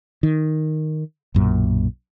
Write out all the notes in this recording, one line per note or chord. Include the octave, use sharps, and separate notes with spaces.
D#3
B1 F#2 A#2